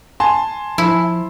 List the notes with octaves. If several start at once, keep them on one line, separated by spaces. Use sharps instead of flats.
G#5 A5 C6
F3 E4